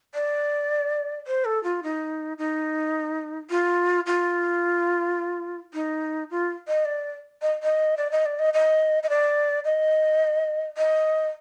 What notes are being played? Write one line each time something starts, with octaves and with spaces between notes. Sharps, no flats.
D5
C5
A4
F4
D#4
D#4
F4
F4
D#4
F4
D#5
D5
D#5
D#5
D5
D#5
D5
D#5
D#5
D#5
D5
D#5
D#5